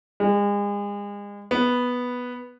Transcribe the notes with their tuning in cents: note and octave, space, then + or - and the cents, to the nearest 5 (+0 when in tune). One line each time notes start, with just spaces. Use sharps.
G#3 -35
B3 -5